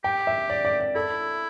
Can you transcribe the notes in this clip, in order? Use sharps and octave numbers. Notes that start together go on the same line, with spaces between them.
G4 G5
E5
D5
D5
D5
E4 A4